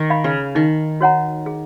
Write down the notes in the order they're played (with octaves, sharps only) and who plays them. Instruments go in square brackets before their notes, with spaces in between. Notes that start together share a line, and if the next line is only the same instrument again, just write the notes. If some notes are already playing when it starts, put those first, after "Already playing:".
Already playing: [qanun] D#3
[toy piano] F5 B5
[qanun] C#3
[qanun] D#3 [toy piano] D#4
[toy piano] F#4 C#5 F#5 A#5
G#4